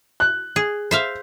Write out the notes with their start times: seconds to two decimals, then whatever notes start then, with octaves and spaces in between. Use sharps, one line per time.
0.20 F#6
0.56 G#4
0.91 C5 E5 F5